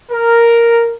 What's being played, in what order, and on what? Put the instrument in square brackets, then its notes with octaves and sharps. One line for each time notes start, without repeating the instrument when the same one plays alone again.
[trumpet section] A#4